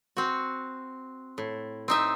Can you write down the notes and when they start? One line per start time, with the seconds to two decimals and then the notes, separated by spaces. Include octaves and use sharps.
0.17 C4 F#4
1.38 A2
1.88 C4 D#4 E5